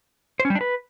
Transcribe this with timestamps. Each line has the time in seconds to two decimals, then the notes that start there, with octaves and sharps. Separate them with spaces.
0.40 C5
0.45 C#4
0.50 G3
0.55 D4
0.61 B4